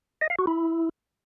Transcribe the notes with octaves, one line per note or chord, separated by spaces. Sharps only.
D#5
F5
F#4
E4